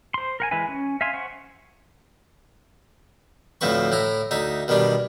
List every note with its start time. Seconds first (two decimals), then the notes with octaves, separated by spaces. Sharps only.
0.14 C5 C6
0.40 A#4 F#5 G#5
0.51 E3 G#3 B4 E5 G#5
0.68 C#4
1.01 E5 F5 G#5 C6
1.13 C5 F#5 C#6
3.61 D2 A2 F3 C4 B4 C#6
3.92 A2 E4 A#5
4.31 D2 D#4 E5
4.68 B2 D#3 G3 D4